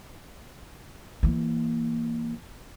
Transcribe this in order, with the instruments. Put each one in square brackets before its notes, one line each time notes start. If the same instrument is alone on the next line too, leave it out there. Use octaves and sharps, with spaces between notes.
[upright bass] E3 A#3